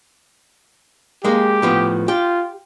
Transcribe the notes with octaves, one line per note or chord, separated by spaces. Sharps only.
G#3 A#3 G4
A2 F3 B3
F4 G4